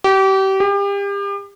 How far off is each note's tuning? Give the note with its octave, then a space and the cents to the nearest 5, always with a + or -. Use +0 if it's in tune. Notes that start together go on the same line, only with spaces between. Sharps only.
G4 -30
G4 +35